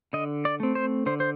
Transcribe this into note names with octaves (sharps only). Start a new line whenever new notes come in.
D3 D#5
D5
A3 C4
C5
D3 C5
C5